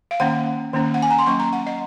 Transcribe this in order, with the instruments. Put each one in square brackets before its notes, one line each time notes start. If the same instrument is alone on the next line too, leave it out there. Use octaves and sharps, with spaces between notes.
[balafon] F5
D#3 A#3 C#4 F#5
D#3 A#3 C#4
F#5
G#5
A#5
C6
F#3 A#3 C#4 C#6
A#5
F#5
D#5